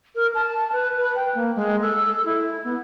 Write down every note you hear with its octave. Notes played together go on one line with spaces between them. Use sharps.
A#4
A5
B4
B4
G5
A#3
G#3
A4
E4
B3